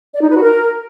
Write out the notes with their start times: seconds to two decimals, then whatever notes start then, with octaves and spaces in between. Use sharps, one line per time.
0.13 D5
0.21 D#4
0.28 B4
0.35 F#4
0.43 A#4